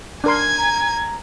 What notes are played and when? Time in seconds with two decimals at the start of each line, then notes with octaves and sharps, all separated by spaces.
0.24 D4 A#4 G#5 C6 G#6
0.58 A#5